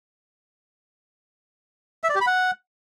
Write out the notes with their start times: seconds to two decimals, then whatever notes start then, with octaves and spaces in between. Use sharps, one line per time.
2.04 E5
2.09 D5
2.15 G4
2.21 B5
2.27 F#5